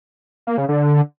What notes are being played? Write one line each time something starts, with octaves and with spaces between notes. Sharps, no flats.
A#3
C#3
D3